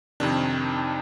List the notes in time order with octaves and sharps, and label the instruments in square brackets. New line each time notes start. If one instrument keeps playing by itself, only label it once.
[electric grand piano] F2 C3 D#3 D4